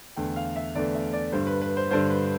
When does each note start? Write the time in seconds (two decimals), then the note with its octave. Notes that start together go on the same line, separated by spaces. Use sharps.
0.16 E2 D3 A3 G5
0.36 F5
0.56 E5
0.75 E2 D3 A3 D5
0.94 E5
1.13 D5
1.32 G2 D3 G3 C5
1.47 B4
1.62 B4
1.77 C5
1.91 G2 D3 G3 C5
2.10 B4